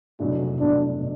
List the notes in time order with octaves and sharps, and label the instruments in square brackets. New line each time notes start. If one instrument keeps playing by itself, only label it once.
[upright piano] F1 E2 B2 F#3 A3 [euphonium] D4
[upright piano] F1 E2 B2 F#3 A3 [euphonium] D4
[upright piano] B2